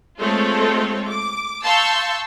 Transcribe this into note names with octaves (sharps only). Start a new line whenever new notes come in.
G#3 A3 C4 F4 A4 C#5
D6
F5 A5 C6 C#6 E6 G6